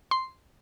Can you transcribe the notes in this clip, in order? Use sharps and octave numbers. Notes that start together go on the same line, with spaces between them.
C6